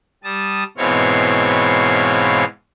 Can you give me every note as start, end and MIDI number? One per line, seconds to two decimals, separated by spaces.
0.24 0.64 55
0.24 0.64 81
0.24 0.64 87
0.77 2.44 44
0.77 2.44 47
0.77 2.44 52
0.77 2.44 60
0.77 2.44 73
0.77 2.44 77